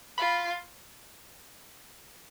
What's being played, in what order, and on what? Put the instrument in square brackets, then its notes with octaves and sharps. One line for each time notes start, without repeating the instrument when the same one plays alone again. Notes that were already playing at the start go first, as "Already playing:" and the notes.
[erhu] F4 [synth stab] B5